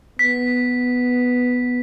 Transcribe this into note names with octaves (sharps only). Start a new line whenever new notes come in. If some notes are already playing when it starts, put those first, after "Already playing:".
B3 B6